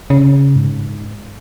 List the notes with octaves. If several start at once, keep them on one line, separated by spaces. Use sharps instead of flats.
C#3
G#2